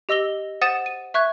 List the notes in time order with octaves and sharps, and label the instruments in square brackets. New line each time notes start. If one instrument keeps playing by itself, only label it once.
[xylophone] G4 D#5 E6 A#6 G7
C5 F#5 D#6 A6 D#7 E7
D#7
E5 C#6 F#6 G#6